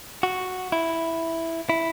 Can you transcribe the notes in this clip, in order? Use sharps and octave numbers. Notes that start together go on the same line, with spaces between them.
F#4
E4
E4